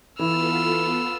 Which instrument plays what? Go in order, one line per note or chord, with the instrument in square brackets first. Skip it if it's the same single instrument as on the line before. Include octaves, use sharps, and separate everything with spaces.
[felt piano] E3 [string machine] B3 F4 A4 [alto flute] B5 [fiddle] E6 F6